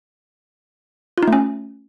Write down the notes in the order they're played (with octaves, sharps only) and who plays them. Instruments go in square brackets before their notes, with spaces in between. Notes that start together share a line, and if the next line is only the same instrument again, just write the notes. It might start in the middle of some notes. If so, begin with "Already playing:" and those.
[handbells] F4
D#4
A3
C#4